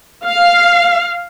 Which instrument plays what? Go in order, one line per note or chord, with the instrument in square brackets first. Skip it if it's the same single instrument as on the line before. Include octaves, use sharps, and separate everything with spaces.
[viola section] F5